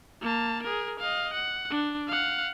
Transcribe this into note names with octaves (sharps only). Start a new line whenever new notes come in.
A#3 A5
G#4 A#4
D#5 F5
F#5
D4
F5 F#5